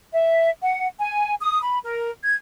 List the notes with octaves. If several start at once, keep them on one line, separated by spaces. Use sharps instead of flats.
E5
F#5
G#5
D#6
B5
A#4
G#6